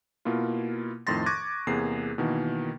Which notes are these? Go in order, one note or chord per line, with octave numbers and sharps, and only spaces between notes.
B2 A#3 E4 F4
F2 A2 D#3 C6 A6 A#6
C#6 D6 F#6 G#6 A#6 D#7
E2 C3 A#3 G#4 C7
B2 D#3 E3 A#3